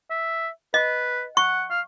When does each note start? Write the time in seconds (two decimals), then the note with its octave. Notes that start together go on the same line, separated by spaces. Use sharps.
0.10 E5
0.74 B4 D#5
1.37 F#5 C#6
1.70 F5